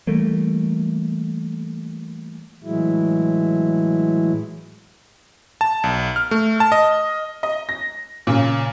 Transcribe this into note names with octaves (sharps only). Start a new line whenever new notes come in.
E3 G3 A3 A#3
A2 E3 F#3 G#3 E4
A5
B1
F6
A3
A5
D#5
D#5
A#6
A#2 C#3